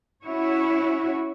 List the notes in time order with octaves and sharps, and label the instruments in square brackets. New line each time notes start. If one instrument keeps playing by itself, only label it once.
[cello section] C#4 E4 F#4 C#5